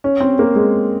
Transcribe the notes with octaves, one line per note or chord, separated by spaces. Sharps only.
C#4
C4
A#3
G#3